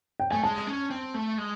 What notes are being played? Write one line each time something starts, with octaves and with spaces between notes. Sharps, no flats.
G5
A3 G#5
G#3 A5
C#4
C4
A3
G#3